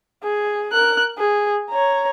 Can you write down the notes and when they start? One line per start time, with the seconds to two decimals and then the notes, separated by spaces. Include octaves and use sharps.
0.23 G#4
0.73 A#4 F#6
1.18 G#4
1.70 C#5 A#5